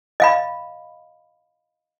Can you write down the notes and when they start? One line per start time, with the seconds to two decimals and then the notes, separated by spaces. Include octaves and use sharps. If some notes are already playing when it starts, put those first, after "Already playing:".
0.20 D#5 F5 B5